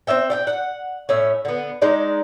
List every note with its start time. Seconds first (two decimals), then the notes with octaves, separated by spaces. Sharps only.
0.07 C4 D4 E5 G5
0.30 D5 E5 G5
0.47 F#5
1.09 A2 C#4 E5
1.45 D3 B3
1.82 G#3 D4 D#4 D5